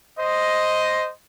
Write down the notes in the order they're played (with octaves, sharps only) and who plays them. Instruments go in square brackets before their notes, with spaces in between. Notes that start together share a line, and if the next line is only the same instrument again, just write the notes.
[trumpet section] C5 D#5